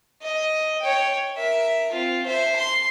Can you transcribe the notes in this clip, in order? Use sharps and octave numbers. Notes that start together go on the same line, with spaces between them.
D#5
C#5 G5
A#4 E5
C4 F4
C5 E5
C6